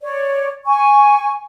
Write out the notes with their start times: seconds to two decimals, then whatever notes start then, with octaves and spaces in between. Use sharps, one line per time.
0.01 C#5 D5
0.67 G#5 C#6